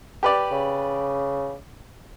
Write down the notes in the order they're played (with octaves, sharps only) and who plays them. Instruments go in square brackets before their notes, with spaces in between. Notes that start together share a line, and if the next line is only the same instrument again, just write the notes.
[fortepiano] G4 B4 D5
[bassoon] C#3